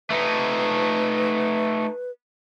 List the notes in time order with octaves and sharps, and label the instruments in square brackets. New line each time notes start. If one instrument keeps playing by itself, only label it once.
[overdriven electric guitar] A3 D#4 [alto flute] B4